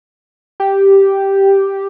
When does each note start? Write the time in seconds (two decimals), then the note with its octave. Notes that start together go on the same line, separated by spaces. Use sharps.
0.60 G4